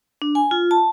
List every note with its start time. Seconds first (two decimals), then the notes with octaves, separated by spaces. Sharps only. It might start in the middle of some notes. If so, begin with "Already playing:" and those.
0.22 D4
0.35 G#5
0.51 F4
0.71 A5